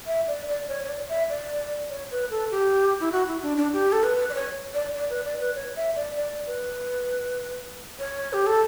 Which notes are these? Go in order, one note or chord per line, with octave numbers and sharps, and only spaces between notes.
E5
D5
D5
C#5
C#5
D5
E5
D5
C#5
B4
A4
G4
E4
F#4
E4
D4
D4
G4
A4
B4
D5
C#5
D5
D5
B4
D5
B4
C#5
E5
D5
D5
B4
C#5
G4
A4